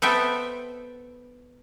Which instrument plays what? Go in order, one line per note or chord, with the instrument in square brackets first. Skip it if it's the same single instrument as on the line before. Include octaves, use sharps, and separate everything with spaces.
[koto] B3 A4 C5 E5 G5